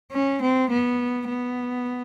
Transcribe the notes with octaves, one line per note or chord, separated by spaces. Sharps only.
C#4
C4
B3
B3